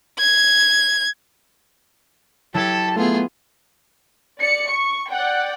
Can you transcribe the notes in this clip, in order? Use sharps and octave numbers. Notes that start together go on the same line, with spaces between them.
G#6
F#3 E4 G4 A4 A5 G#6
A3 B3 F4 G#4
D5 C#7
C#6
D5 F#5 G5